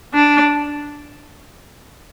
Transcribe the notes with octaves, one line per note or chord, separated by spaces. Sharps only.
D4